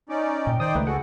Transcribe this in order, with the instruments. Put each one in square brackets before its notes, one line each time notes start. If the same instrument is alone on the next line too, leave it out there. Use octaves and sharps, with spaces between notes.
[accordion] C#4 D#4 D5
[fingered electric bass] A#2 [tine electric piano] G5
[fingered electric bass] D#3 [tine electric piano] D#4 D#6 [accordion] C5 D5 G5
[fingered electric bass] C#2 [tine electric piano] A3 B4
[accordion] F#4 G#4 A4 [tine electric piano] F#5